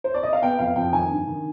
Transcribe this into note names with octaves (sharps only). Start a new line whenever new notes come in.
C5
D5
D#5
F5
B3 G5
F2 F5
F2 G5
D#3 G#5
G2
D#3